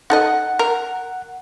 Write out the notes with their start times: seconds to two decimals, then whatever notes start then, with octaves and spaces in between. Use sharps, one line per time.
0.10 D#4 A4 D#5 F#5
0.59 A#4